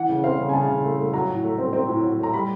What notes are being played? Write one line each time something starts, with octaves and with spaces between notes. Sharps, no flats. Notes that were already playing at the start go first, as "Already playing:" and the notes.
Already playing: E3 F#5
C#3
C4 F5
C#3
G#5
C#3 A5
C#3
A3
A3
F#3 A#5
A2
A3
C4
C4
A2
F#3
A3 A#5
G3 B5